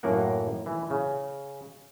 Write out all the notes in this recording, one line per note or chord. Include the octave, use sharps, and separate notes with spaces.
F#2 A2 A#3 A#4 F#5
E3
C#3